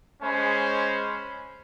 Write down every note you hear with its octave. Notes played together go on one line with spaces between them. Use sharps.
G#3 C#4 C5 G#5 B5